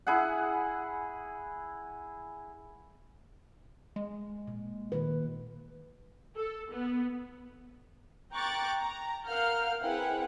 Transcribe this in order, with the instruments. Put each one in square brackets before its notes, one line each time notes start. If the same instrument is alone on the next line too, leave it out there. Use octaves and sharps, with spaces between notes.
[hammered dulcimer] E4 G#4 F#5
[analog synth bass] G#3
[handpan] A#2
A#2 D#3 B4
[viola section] A4
B3
[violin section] G5 A#5 C#6 D6 F#6 A6
A#5
A#4 F5 F#5 F6 G6
C4 E4 G#4 B4 F#5 G5